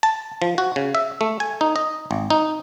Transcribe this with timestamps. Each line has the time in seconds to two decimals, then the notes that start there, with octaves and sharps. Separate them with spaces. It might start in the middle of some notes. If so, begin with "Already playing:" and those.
0.03 A5
0.42 F3
0.58 F#4
0.76 C#3
0.95 E5
1.21 A3
1.40 G#5
1.61 D#4
1.76 D#5
2.11 G#1
2.30 D#4